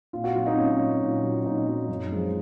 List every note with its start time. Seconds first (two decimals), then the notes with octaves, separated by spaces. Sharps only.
0.13 A#2 F4
0.24 F#4
0.35 F#3 F4
0.46 D#4
0.57 A#2 C#4
0.79 F#3
1.01 A#2
1.23 F#3
1.45 A#2 D#4
1.67 F#3
1.88 F#2
2.11 F3 G#3